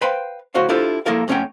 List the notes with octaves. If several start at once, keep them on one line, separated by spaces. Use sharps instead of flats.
B4 C5 F5 G5 B5 C6
D2 A2 F#4 C5 C#5 F5
D4 E4 F4 G4 A4 C5
F3 A#3 E4 A4 A#4 F5
F2 A3 C#4 C#5 F#5 G5